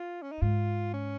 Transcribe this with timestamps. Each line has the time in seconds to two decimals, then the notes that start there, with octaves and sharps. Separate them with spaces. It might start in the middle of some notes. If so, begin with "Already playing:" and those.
Already playing: F4
0.22 C#4
0.32 D#4
0.42 G#2 F4
0.94 C#4